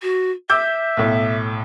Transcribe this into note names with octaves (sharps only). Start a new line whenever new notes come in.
F#4
E5 D6 E6 G6
B1 A2